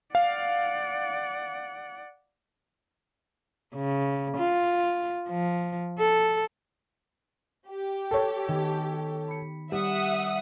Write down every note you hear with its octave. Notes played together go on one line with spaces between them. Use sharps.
D5 F5 F#5
C#3
F4
F3
A4
G4
A4 C#5
D#3 B3 G#5
B5 C#7
G3 E5 F#5 D#6